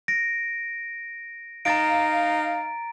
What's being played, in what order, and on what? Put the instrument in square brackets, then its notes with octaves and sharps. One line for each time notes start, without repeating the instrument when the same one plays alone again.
[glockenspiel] A#6 D7
[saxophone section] D#4 F5 [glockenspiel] A#5 A6 D7